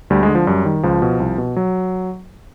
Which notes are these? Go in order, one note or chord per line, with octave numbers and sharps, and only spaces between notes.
D2 G3
G#3
D3
F3
F#2 G3
D#3
C#2 F3
B2
C2
B2
F#3